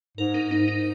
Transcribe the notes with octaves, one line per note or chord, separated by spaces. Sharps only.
G#2 A#4
D#4
D#4
D#4